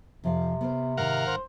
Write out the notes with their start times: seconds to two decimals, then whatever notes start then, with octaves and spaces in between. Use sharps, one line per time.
0.24 F2 C3 F3 F5
0.61 B3 A#4 C5
0.97 G#2 D#3 A#4 F5 F#5
1.27 C5